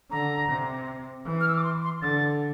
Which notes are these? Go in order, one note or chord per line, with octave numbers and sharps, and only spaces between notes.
D3 A#5
C3
E3
F6
E6
D6
C6
C6
D3 A6